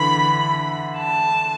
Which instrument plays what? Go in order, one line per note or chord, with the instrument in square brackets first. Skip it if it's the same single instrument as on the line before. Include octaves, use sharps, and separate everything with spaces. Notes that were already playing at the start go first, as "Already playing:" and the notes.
Already playing: [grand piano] D3 E3 [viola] B5
[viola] A5